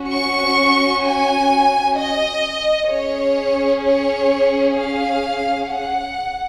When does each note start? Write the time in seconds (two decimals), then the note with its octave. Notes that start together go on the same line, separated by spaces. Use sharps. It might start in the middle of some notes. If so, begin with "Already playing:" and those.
Already playing: C#4 F#4
0.11 C#6
1.04 G#5
1.97 D#5
2.89 C#4 G#4 C#5
3.81 C#5
4.75 F5
5.67 F#5